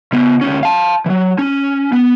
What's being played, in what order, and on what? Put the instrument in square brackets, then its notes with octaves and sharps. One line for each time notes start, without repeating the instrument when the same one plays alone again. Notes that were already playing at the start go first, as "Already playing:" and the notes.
[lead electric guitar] C#3 B3
D2 C#4
F5 A5
E3 F#3
C#4
B3